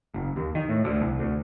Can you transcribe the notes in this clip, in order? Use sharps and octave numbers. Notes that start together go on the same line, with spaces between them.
F#1
D#2
D#3
A2
D2
C2
D2